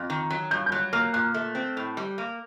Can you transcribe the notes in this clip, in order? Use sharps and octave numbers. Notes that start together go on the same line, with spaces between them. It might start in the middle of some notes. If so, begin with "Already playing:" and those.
Already playing: F2
D#3
F#3
G2 G6
G6
F#3 F#6
A#3 F6
A#2 F#6
A3
C4
A2
G3
A#3